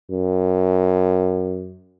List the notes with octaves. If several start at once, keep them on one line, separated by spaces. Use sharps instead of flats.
F#2